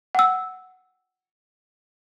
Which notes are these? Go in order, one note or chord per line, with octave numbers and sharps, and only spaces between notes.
F#5 G5 E6